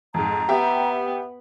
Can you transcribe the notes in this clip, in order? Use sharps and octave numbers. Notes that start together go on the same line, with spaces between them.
F2 G#2 A#5
B3 G4 E5